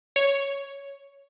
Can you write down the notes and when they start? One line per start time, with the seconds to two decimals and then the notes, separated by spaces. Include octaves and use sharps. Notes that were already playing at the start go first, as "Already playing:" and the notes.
0.16 C#5